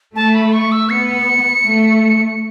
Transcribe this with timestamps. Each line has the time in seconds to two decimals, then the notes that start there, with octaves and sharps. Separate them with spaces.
0.16 A3 A5
0.35 B5
0.53 C#6
0.72 E6
0.90 B3 C#7
1.65 A3